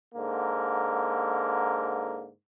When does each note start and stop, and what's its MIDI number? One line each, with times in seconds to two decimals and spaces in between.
0.15 2.29 44
0.15 2.29 50
0.15 2.29 58